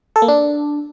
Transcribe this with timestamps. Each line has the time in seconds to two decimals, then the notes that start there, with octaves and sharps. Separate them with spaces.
0.16 A4
0.22 A#3
0.28 D4